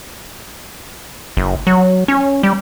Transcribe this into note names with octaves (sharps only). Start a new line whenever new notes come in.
F#1
F#3
C#4
G3